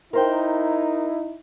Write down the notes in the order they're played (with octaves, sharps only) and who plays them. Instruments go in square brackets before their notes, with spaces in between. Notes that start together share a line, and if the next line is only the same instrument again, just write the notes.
[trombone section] D#4 E4 [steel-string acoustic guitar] A#4 C5 G5